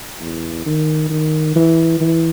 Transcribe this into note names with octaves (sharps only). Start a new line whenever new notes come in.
E2
D#3
D#3
E3
E3